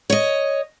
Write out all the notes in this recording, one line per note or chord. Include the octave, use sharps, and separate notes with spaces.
C#5 D#5